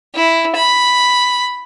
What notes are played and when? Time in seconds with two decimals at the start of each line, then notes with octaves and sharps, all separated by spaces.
0.15 E4
0.56 B5